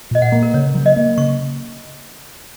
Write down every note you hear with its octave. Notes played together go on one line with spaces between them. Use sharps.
A#2 D#5
F#5
A#3
A#4
C#3 C#5
F#3
D#5
A#3
C#3 C#6